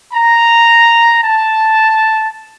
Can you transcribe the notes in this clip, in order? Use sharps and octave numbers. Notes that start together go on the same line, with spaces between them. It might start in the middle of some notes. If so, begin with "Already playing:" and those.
A#5
A5